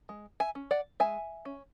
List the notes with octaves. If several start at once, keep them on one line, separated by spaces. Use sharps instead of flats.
G#3
E5 G#5
C#4
D5 F#5
G#3 E5 G#5
C#4